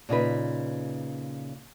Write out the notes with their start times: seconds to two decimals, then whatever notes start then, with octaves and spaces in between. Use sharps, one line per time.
0.09 A#2 C#3 D#4 B4